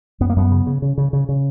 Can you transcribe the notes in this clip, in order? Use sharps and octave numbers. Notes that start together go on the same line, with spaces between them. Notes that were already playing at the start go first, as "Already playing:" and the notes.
F#2 B3
A#3
F#2 B3
C#3
C#3
C#3
C#3
C#3
C#3